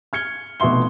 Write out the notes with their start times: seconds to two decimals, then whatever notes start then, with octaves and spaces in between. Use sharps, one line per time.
0.13 F6 G#6 C#7 G7
0.60 F1 B2 E5 C6 G7